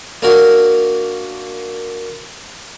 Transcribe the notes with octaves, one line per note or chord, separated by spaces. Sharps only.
A#3 D4 F#4 A#4